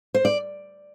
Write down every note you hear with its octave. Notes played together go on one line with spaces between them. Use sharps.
C5
D5